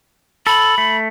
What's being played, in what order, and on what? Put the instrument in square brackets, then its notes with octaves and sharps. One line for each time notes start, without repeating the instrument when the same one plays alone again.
[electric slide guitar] A4 [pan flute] B5
[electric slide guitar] A3